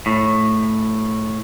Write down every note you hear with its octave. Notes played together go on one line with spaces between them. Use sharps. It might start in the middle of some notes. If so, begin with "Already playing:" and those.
A2